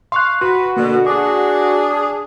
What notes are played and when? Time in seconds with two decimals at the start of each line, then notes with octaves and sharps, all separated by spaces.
0.12 F5 C6 C#6 F#6
0.41 F#4 B4 C6
0.77 B2 D3 A#3
1.06 D4 G#4 D6